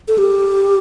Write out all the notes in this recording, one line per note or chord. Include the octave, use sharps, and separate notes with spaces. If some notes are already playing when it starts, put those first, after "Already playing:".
A4
G4